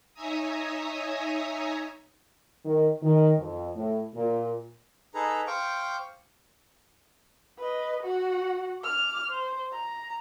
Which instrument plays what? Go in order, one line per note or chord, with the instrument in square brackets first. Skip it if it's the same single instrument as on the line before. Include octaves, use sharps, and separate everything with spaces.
[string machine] D#4 C#5 E5 G#5 A#5 D#6
[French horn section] D#3
D#3
F2
A2
A#2
[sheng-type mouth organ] D#4 G#4 A4 B4 A#5
C5 F5 G5 C#6 D6
[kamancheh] B4 D#5
F#4 F#5
D6 F6
C5
A#5